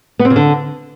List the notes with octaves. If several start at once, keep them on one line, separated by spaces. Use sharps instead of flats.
B3
C4
C#3
D3